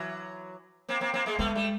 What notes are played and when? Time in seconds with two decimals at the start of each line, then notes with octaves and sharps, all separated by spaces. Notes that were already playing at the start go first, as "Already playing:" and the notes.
Already playing: E3 F#3
0.89 A#3 C4
1.01 A#3 C4
1.14 A#3 C4
1.26 G#3 A#3
1.39 G#3 A3 B3
1.55 G3 A3